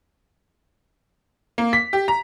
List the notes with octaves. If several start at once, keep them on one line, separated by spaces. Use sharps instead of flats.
A#3
B6
G4
A#5